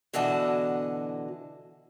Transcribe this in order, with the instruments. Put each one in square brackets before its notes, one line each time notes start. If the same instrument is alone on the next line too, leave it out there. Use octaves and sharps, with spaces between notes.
[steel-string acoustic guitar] B2 D3 E3 F#4 D#5 A5